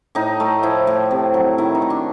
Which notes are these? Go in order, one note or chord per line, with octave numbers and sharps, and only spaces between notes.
A2 D#4
A3
F3 E4
A2
C3
F#3
D#3 E4
D#4
A3
D4